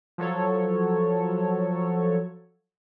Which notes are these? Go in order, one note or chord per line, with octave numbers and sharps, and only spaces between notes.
F3 F#3 A4 C#5